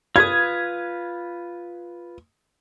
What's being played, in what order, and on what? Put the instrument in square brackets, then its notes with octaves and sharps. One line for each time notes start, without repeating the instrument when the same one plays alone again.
[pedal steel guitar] F4 B4 D#6 [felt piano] G#6